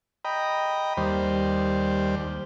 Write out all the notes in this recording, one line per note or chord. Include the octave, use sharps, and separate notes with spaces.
D#5 G5 A#5 B5
D#2 G3 C5